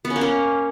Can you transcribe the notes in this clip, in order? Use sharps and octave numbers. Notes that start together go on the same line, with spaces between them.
B3
C#4
A#3
C#4